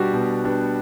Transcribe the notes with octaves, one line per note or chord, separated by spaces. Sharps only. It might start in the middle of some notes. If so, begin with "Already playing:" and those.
Already playing: B2 G3 B3 D4 F#4 G4
B2
G3 B3 D4